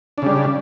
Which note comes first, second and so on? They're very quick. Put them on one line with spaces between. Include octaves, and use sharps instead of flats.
D4 C#3 G3